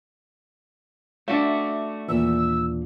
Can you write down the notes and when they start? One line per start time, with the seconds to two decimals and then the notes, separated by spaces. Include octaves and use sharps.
1.28 A3 D4 F#4 E5
2.08 D#2 A#2 E3 E6